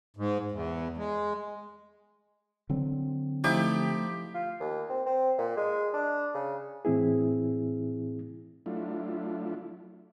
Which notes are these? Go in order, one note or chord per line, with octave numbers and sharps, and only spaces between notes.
G#2
E2
G#3
D3 F#3 C4
F3 A3 D#4 E4 G4
F4
D#2
C4
C4
A#2
G#3
D4
C#3
A2 E3 C4 E4 G#4
F#3 A3 D4 E4 F4